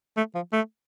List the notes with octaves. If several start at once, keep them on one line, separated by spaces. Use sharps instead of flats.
A3
F3
A3